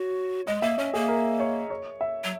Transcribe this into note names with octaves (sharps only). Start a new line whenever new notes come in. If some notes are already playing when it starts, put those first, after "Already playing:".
Already playing: F#4 C#5
G#3 D#5
A#3 E5
C#4 C#5
A#3 G#4
A#4
C#5
C#5
E5
F#3